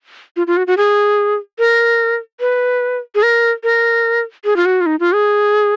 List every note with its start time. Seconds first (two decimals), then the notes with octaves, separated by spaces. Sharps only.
0.36 F4
0.47 F4
0.57 F#4
0.67 F#4
0.77 G#4
1.59 A#4
2.40 B4
3.15 G#4
3.23 A#4
3.63 A#4
4.45 G#4
4.56 F4
4.66 F#4
4.81 F4
4.86 D#4
5.00 F4
5.13 G#4